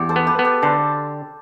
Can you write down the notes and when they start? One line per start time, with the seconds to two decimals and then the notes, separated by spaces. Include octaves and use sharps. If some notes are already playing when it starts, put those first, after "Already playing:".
Already playing: E2 G4
0.09 A4 C5
0.16 B3
0.27 G4 B4
0.39 B3
0.45 G4 B4
0.62 D3 A4 C5